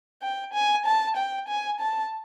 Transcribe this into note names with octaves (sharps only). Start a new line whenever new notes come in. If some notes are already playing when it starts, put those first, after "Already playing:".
G5
G#5
A5
G5
G#5
A5